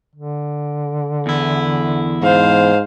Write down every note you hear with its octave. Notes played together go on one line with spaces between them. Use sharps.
D3
E2 E4
G#2 C5 F5